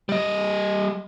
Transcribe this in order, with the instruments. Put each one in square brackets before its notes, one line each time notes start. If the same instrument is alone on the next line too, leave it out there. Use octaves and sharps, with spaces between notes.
[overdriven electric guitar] G3 D#5